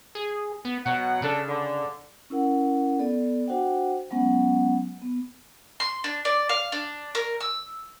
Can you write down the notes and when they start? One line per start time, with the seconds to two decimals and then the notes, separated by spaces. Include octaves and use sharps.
0.15 G#4
0.65 B3
0.85 B2 F#3 F#5
1.22 C#3 D4 A4
1.47 D3
2.30 C#4 E4 A#4 F#5
2.99 B3 A4 D5
3.48 D4 F#4 C5 F#5 G5
4.11 F#3 G#3 B3 C#4 F#5
5.02 B3
5.80 C6
6.04 D4
6.25 D5
6.49 F5
6.72 D4
7.15 A#4
7.40 E6